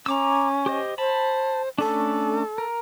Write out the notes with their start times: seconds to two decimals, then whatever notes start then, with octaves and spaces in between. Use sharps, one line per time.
0.06 C#4 A#5 D6 E6
0.66 G4 C5 D#5
0.98 C5 A5 B5
1.78 A3 C#4 D4 A4
2.58 A#4